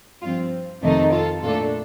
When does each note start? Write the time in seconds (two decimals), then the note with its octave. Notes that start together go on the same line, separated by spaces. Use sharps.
0.22 G2 F3 C4 F4
0.82 F2 C3 D#3 A3 D#4
1.12 F4 A4
1.43 A#2 A3 D4 F4 A4